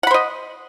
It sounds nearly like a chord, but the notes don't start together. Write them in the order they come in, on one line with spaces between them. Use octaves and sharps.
F#5 B5 C5 D#5